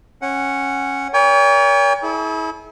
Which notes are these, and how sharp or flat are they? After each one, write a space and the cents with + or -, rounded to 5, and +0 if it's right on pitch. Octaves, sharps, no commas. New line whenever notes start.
C#4 -15 F#5 +0
A#4 +25 C#5 +45 G5 +45
E4 -30 G#4 +45